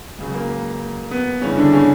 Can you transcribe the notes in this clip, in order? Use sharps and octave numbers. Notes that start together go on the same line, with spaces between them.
C#2 C#3 F#3
A#3
B3
G2 C#3 E3 C#4
D3 D4
C#3 C#4